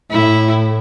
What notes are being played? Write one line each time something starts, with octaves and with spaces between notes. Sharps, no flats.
A2 E4